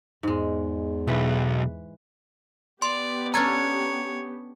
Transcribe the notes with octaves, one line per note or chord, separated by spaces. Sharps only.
E2 G#2 G#3
B1 E3 B4
B3 G4 D5 C6
C#4 D4 A4 C#5 A#5 G#6